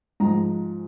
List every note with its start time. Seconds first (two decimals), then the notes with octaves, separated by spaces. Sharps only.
0.20 G#2 F3 G#3 A#5